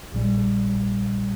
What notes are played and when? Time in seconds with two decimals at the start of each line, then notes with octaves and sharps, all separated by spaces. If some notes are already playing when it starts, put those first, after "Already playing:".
0.12 A#1 A#2 G3